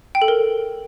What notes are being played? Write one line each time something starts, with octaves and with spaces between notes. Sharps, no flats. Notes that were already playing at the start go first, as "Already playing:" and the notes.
G5
A4
A#4